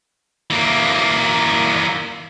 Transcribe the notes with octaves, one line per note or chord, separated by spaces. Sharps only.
E3 A#3